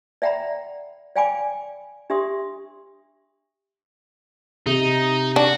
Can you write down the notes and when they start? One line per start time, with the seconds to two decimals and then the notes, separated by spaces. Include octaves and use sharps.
0.22 D5 E5 F#5 G5 A#5 B5
1.16 D5 F5 G5 G#5 B5 D6
2.10 D4 G4 E5 C6 D#6
4.66 C3 D#4
5.36 D4 F#4